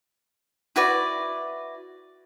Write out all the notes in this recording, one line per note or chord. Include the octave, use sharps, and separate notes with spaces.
E4 F#4 B4 D5